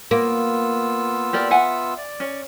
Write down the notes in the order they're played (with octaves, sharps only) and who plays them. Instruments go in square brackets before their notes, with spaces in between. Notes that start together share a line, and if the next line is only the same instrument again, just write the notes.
[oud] A#3 [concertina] B3 F4 E6
[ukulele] G4 A#4 D5
E5 F#5 G#5
[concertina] D5
[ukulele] C#4